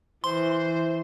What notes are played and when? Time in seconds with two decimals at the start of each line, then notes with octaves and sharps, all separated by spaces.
0.24 E3 C5 C6